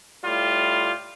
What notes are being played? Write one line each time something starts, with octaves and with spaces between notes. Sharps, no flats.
A2 G3 F4